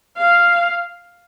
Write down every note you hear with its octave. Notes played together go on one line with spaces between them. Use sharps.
F5